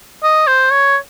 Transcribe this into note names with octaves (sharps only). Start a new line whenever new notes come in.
D#5
C5
C#5